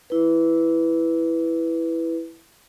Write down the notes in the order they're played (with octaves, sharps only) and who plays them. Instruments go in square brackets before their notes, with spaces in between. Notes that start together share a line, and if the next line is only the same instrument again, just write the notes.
[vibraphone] E4 B4